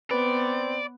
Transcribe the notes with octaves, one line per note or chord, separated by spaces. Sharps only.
B3 C4 B4 D5